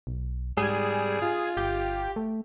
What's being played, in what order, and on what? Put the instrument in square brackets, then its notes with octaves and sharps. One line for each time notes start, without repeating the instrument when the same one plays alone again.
[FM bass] B1
[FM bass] G#2 [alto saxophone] G3 [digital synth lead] G#4
[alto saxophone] F4
[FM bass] G1 [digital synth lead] G4
[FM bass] A3